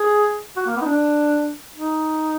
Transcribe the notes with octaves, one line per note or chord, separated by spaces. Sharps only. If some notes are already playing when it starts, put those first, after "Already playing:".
Already playing: G#4
F#4
A#3
B3
D#4
D4
D#4